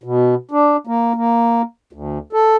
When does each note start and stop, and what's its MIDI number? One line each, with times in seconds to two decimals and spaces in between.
0.03 0.35 47
0.51 0.77 62
0.87 1.13 58
1.16 1.62 58
1.93 2.18 38
2.33 2.56 69